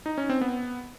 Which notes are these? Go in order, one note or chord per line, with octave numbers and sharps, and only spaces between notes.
D#4
C#4
C4
B3